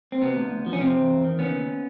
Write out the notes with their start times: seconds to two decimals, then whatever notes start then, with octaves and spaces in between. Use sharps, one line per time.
0.12 C4
0.21 C3 B3
0.36 D2
0.51 D2
0.66 F3
0.73 C#4
0.80 C3 C4
0.96 E2
1.10 E2
1.24 D#3
1.39 C#3 B3 C#4
1.54 D#2